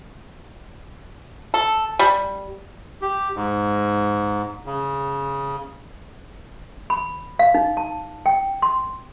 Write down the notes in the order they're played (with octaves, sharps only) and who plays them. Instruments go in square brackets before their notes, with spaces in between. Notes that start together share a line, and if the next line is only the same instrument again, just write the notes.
[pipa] A4
G3
[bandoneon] G4
G#2
C#3
[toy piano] B5
F5
D#4
A5
G5
C6